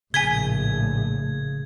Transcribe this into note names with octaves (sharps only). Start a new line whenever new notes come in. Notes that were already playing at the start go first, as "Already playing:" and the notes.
A#1 A2 C#3 G#5 G#6 B6 G7